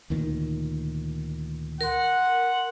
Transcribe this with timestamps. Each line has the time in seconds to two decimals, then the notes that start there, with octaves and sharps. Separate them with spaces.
0.10 D2 A#2 D#3
1.81 A#4 F#5 C6